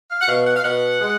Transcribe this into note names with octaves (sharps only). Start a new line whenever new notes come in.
F5
F#5
B2 F5
F#5
F5
B2 F#5
G#3